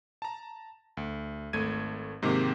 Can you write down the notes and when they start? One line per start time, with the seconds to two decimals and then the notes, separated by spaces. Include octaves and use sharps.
0.22 A5 A#5
0.97 D2
1.53 G#1 A3 G#6 D#7
2.22 G#2 C3 D#3 G#3 A#3 G4